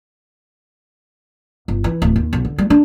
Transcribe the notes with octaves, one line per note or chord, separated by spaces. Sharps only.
G1
E3
D1
D#2
B1
D3
G3
D4